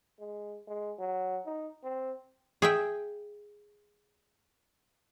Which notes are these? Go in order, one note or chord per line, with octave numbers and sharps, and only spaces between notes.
G#3
G#3
F#3
D#4
C4
G#4 E5 G5